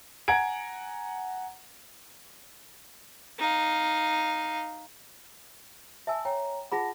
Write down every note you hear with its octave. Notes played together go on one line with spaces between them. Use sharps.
F#5 G#5 A#5 G#6 D7
D#4 F5
E5 G#5 A5 E6
C#5 G5 A#5
F4 G#4 F#5 A5 B5 A#6